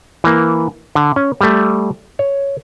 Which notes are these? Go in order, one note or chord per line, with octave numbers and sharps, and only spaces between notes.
E3 A#3
D3
C#4
G3 A3
C#5